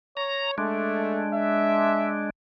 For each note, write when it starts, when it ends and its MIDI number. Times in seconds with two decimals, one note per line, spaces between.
0.17 0.57 73
0.17 0.51 82
0.58 2.30 56
0.58 1.23 57
0.58 2.30 62
1.34 2.13 76